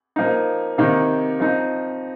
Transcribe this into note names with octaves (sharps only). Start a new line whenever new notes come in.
F3 A#3 D#4
C3 D#3 A#3 D#4
F3 C4 D#4